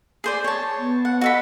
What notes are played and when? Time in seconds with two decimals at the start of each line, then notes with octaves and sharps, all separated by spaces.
0.24 G#4 C5 D5
0.44 C#5 A5
0.78 B3
1.05 F#5
1.21 F#4 A4 D#5 B5